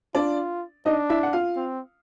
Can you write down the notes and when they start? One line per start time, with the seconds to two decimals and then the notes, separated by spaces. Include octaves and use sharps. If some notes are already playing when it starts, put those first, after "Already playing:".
0.15 D4 F4 D5
0.86 D4 D#4 D#5
1.10 E4 E5
1.23 F#5
1.33 F4 F5
1.56 C4